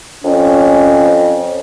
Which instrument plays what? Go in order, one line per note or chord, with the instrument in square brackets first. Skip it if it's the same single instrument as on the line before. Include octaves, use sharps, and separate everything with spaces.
[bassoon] F2 [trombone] C#4